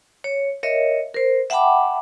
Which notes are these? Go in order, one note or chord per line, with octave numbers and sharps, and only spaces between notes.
C#5
A#4 C#5 D#5 E5
A#4 C5
E5 F#5 G5 A5 B5 D6